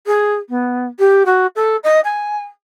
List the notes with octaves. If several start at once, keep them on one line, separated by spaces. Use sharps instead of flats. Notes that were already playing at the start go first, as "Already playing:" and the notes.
G#4
B3
G4
F#4
A4
D#5
G#5